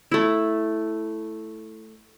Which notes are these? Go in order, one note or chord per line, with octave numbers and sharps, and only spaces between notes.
A3 E4